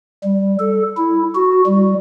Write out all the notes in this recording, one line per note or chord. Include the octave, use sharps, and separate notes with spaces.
G3
A4
E4
F#4
G3